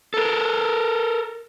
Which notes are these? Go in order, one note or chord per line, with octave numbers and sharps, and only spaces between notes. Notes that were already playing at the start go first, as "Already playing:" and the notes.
A4 A#4